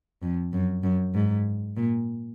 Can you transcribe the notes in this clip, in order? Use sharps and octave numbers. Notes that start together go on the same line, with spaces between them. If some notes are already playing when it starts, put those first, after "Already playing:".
F2
F#2
F#2
G#2
A#2